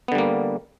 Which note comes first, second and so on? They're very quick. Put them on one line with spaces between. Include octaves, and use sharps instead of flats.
B3 D3 G3 A#3